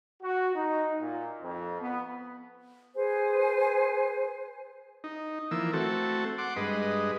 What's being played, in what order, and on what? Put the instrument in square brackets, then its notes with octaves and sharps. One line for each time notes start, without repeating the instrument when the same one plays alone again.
[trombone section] F#4
D#4
A#2
F2
B3
[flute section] G#4 B4 C5 G#5
[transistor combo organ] D#4
E3 F3 A#3 E6
A3 C4 F#4 A4
F#5 C6 D6
G2 G#3 B4 D#5